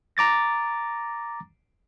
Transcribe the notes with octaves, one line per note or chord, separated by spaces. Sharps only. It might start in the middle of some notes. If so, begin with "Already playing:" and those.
A#5 D6 A6 A#6